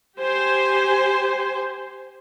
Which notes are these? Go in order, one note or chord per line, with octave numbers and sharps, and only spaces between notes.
G4 C5 G#5